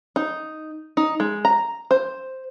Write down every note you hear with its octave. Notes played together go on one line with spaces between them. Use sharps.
D#4
D#4
G#3
A#5
C5